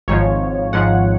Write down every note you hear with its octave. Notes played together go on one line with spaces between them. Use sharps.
G#1 G#2 F3 C#5
G#1 G#2 F3 F#5